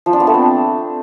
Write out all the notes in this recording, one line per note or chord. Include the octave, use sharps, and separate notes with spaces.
F3
D4
B3
A3
C4